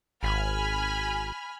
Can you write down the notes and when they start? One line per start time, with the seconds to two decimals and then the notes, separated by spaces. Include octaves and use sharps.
0.23 G#1 G#5 B5 F6